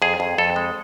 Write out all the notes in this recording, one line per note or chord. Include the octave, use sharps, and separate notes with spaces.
F2 G#4
F2
F2 A4
G#3